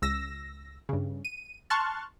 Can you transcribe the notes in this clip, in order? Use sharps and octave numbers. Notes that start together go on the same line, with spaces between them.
C#2 E6 A#6
G2 C#3
D#7
A5 C6 C#6 F6 F#6 A6